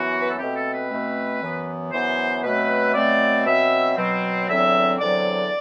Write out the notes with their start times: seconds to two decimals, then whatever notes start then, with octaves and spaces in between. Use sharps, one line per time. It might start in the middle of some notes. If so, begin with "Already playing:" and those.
Already playing: F#2 E3 B3 F#4
0.21 B4
0.30 A4
0.38 B2 A3 C4 G4
0.56 A4
0.73 B4
0.90 B2 A3 C4
1.41 F#2 E3 B3
1.92 F#2 E3 B3 C5
2.43 B2 F#3 A3 C4 B4
2.82 E5
2.95 B2 F#3 A3 C4 D5
3.46 B2 F#3 C4 E5
3.97 B2 F#3 C4
4.48 E2 D3 F#3 C4 E5
5.00 E2 D3 F#3 C4 D5